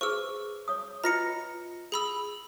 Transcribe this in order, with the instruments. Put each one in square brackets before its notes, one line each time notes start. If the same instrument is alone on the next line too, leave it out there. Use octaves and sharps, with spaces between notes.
[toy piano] G#4 B4 C5 [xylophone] C#6 E6
[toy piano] C#5 D#6
[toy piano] F4 B4 D#5 [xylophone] A#5 A#6 C#7
[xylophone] G#4 B5 E6